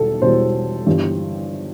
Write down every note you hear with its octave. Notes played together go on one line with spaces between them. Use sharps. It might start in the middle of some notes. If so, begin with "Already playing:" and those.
Already playing: E1 E2 B2 G3 A4
E1 E2 B2 G3 C5
G1 G2 E3 G3